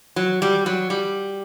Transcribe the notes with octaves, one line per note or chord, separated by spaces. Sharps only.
F#3
G3
F#3
G3